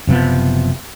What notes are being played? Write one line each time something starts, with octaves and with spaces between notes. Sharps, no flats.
F#1 C3 F3 B3